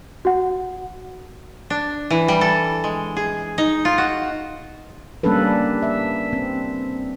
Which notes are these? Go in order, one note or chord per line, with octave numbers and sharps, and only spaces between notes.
F#4 F#5
D4
E3
G3
A4
G#3
G#4
D#4
F4
F#4
G3 A#3 C#4 D4 A4 B4
E5
C4